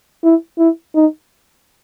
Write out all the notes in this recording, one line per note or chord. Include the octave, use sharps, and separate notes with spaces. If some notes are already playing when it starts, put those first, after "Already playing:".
E4
E4
D#4